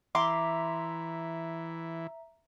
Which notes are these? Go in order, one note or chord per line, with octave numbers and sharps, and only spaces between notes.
E3 E5 A#5 C6 D6